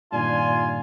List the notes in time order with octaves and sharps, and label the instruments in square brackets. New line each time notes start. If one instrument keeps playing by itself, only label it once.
[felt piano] G2 A#2 D#3 [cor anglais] F4 [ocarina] D5 [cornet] G#5